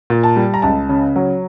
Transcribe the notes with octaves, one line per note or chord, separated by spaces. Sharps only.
A#2
A5
G3
A#5
C#2 A5
C#3
F#3